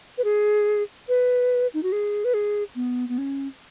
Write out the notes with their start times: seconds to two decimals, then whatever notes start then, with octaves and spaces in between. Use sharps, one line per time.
0.18 B4
0.24 G#4
1.09 B4
1.74 D#4
1.83 F#4
1.92 G#4
2.25 B4
2.34 G#4
2.75 B3
3.09 B3
3.18 C#4